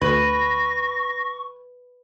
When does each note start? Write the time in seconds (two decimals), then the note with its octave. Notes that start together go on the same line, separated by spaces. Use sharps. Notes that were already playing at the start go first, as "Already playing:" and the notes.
0.02 D2 B4 C#6 A#6